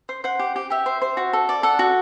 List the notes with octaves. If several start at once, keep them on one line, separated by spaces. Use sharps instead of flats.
C5
C5 F#5
G4
G4
G4 E5
C5
C5
F#4
A4
D5
A4 F#5
F#4